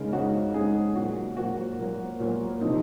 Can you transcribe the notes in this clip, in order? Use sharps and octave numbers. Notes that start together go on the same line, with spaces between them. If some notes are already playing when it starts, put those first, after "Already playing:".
Already playing: C#3 G#3 D#4 A#4
C#3 G#3 D#4 F#4
C#3 G#3 D#4 G#4
A#2 F#3 A#3 F#4
A#2 F#3 A#3 F#4
A#2 F#3 A#3
A#2 F#3 A#3
C3 F3 C4 D#4